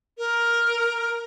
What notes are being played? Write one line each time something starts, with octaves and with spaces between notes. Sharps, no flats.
A#4